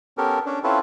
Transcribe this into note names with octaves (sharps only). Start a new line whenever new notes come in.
B3 C#4 G4 A4 A#4
C#4 D4
C4 C#4 E4 F4 A4 B4